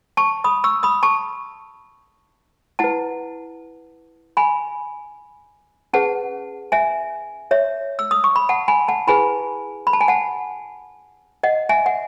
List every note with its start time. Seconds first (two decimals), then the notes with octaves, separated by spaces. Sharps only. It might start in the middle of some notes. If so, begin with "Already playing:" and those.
0.17 A5 C#6
0.44 B5 D#6
0.64 C#6 E6
0.83 B5 D#6
1.03 A5 C#6
2.79 E4 B4 F#5 A5
4.37 G#5 B5
5.93 C#4 G#4 B4 F#5 A5
6.72 E5 G#5
7.51 C#5 E5
7.99 E6
8.11 D#6
8.24 C#6
8.36 B5
8.49 F#5 A5
8.68 G#5 B5
8.88 F#5 A5
9.07 E4 G#4 B4 G#5 B5
9.87 B5
9.93 A5
10.01 G#5
10.08 F#5 A5
11.43 D#5 F#5
11.69 E5 G#5
11.86 F#5